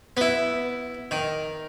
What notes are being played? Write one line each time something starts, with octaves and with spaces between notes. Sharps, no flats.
B3 E4
D#3